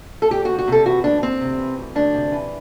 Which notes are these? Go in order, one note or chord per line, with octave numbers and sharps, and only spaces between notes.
A4
D2 G4
F#4
D2
F#4
C3 A4
E3 F#4
D2 D4
D2 C4
C3
E3
D2
D2 D4
C3
E3